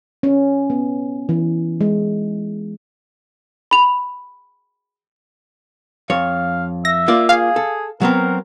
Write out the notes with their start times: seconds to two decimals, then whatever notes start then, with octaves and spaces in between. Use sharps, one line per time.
0.23 C#4
0.70 B3
1.29 E3
1.81 G#3
3.71 B5 F7
6.10 F2 C#5 F5
6.85 E5 A#6
7.08 A#3 F4 D5
7.29 G#4 F5
7.56 A4
8.01 F#3 B3 C4 A#4